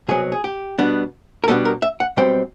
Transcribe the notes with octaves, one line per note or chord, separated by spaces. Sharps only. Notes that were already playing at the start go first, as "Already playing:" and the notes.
C2 B2 F#3 G#4
G#4
G4
B2 G3 B3 D4
A#4
B2 G3 B3 D4 A4
A#4
E5
F#5
B1 B2 G3 C4 G5